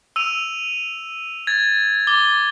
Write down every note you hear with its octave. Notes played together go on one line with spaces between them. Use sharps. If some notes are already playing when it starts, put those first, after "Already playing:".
E6 D#7 F7
G#6 A6
D6 A6 G7